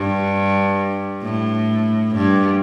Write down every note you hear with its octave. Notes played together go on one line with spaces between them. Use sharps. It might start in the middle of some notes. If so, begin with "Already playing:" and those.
Already playing: G2
A2
G2